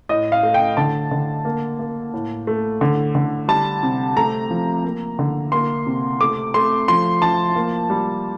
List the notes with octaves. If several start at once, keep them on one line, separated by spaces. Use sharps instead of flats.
A2 D#5
F5
A3
G5
D3 A5
D3
A#3
A#3
A2
A3
D3
D3
G3 A5
C3
A3 A#5
F3
A#3
D3
A#3 C6
C3
A3 D6
A3 C6
F3 C6
F3 A5
A#3
G3